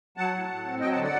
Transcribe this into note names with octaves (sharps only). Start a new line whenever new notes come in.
F#3 F#5 A5
A2
A2
C4
F#3 D#5 G5
F#5 A5
D3
D5 F#5